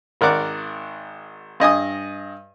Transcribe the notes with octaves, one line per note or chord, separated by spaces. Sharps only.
G#1 A#4 D5 F#5 D6
G2 D#5 G#5 D#6